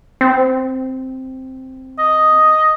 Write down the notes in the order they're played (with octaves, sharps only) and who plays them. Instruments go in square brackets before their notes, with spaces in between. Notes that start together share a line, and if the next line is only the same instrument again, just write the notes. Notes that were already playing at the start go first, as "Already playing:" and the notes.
[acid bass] C4
[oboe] D#5